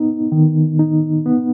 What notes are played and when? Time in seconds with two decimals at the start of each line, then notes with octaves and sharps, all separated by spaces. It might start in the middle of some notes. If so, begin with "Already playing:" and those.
Already playing: B3 D#4
0.32 D#3
0.79 D#4
1.26 B3